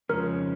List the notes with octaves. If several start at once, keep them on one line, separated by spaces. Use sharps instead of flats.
F2 C#3 F3 G#3 C#4 A#4